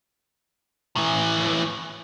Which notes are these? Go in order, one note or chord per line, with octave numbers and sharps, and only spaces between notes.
A2 E3